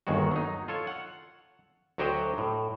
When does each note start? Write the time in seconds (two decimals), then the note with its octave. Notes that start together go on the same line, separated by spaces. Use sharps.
0.07 G1 D#2 D#3 G#3 F#4
0.31 F#3 D#4
0.68 F4 A4 C#5
0.87 F#5
1.98 D2 F#3 F#4 G4 C5 D#5
2.38 A2